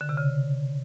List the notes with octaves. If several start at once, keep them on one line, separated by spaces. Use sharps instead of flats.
D3
C3
C#3